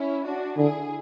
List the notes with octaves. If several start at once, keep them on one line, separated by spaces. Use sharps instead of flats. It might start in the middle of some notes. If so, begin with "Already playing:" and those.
Already playing: C#4 E4
D4 F#4
D3 E4 G#4